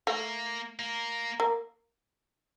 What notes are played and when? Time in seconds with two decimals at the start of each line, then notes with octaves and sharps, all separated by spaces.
0.07 A3 A#3
0.79 A#3
1.40 A#3